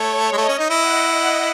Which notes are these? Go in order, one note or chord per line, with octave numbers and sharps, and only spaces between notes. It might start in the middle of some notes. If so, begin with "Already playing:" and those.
Already playing: A3 C#5
G#3
A3 D#5
C#4
D#4
E4
F#5